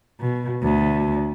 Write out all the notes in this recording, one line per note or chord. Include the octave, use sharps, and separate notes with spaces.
B2
D2